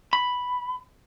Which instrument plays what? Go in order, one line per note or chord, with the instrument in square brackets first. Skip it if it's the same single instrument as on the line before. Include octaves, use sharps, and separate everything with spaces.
[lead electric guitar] B5